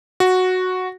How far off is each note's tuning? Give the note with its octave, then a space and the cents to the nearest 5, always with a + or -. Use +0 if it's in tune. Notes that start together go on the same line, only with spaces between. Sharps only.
F#4 -5